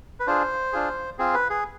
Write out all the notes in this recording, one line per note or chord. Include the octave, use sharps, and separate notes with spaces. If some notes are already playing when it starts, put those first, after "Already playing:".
B4
D4 F4 G#4 C5
D4 F4 G#4
C4 F4 G#4
B4
G#4